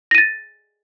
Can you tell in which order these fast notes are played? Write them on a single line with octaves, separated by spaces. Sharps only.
A#6 D#7 A6